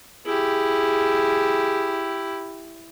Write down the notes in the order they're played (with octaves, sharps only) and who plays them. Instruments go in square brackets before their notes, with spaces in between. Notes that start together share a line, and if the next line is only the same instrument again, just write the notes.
[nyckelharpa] E4 G4 [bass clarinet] G#4